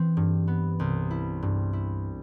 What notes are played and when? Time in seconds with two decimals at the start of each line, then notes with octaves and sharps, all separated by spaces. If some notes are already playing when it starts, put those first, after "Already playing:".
Already playing: E3 C4
0.17 G2
0.48 B3
0.80 C2
1.11 E4
1.43 G2
1.73 E4